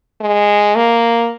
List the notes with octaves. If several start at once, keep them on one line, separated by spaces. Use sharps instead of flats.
G#3
A#3